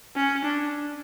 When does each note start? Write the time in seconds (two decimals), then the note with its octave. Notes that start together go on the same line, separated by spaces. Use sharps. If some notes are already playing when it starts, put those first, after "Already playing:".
0.16 C#4
0.45 D4